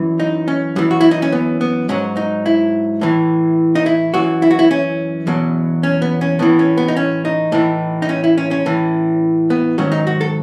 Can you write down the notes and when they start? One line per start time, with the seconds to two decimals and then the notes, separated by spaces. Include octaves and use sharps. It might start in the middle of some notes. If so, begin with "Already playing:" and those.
Already playing: F#2 E3
0.20 D#4
0.48 C#4
0.76 F#2 E3
0.91 F#4
1.01 E4
1.11 D#4
1.22 C#4
1.32 B3
1.61 B3
1.89 G#2 F#3 C#4
2.17 D#4
2.46 E4
3.01 A2 E3
3.75 D#4
3.86 E4
4.14 F#2 E3 F#4
4.42 E4
4.51 F#4
4.59 E4
4.71 C#4
5.27 E2 B2 F#3
5.83 C#4
6.02 B3
6.21 C#4
6.39 A2 E3 B3
6.59 C#4
6.77 B3
6.88 D#4
6.97 C#4
7.25 D#4
7.52 A2 E3
8.02 D#4
8.09 C#4
8.24 E4
8.38 C#4
8.51 C#4
8.66 A2 E3
9.50 B3
9.78 G#2 D#3 F#3 C#4
9.92 D#4
10.07 F#4
10.21 A4